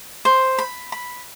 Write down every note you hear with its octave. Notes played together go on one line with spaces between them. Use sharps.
C5
B5
B5